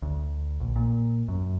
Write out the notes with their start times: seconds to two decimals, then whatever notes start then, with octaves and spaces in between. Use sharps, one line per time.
0.02 D2
0.60 A#1
0.76 A#2
1.28 F#2